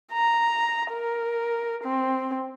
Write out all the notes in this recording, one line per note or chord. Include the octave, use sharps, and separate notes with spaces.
A#5
A#4
C4